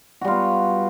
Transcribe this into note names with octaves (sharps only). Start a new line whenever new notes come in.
G3 B3 F4 F#4